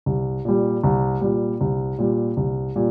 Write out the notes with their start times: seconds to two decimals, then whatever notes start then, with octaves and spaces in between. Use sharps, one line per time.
0.06 C2
0.45 A#2 G3
0.84 C2
1.21 A#2 G3
1.61 C2
1.98 A#2 G3
2.37 C2
2.76 A#2 G3